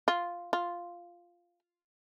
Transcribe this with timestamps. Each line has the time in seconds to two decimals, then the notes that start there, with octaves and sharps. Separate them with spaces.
0.08 F4
0.53 F4